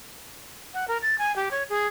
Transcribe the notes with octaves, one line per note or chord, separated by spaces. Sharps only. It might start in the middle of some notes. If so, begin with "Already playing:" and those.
F#5
A#4
A6
G#5
G4
C#5
G#4